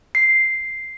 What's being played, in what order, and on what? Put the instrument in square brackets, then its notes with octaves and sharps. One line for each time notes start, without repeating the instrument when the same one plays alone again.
[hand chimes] C7